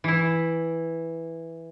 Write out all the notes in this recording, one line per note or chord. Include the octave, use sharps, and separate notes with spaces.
E3 E4